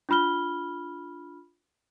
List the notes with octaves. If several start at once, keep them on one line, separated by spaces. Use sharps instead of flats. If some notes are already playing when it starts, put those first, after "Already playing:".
D4 F4 B5 F6 G7